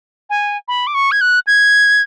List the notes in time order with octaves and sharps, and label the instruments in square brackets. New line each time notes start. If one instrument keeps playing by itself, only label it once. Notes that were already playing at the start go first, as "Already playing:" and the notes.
[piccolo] G#5
B5
D6
C#6
G#6
F#6
G#6